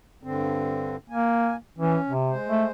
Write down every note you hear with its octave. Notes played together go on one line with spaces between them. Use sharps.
G2 D3 C4
A#3 G#5
E3 C#4
C3
G#3 C5
A3